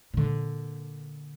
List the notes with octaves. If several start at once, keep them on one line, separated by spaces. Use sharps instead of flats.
A#2 D3